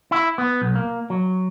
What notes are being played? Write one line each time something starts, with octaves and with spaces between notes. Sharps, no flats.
E4
B3
B1
A#3
F#3